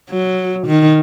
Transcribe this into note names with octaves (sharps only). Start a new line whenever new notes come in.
F#3
D#3